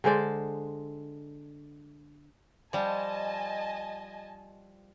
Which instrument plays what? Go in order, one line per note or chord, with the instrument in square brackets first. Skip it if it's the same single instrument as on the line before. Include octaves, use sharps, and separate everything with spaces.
[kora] D3 G#3 C5 D5
[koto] F3 G3 [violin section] D#5 G#5 A5